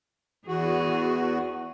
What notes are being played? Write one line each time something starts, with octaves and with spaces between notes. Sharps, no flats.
E2 E3 F#4 G#4